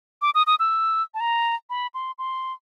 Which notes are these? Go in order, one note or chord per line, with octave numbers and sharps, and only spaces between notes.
D6
D#6
D#6
E6
A5
A#5
B5
C6
C6